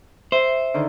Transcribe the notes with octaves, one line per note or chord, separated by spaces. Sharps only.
C5 E5
D3 D#3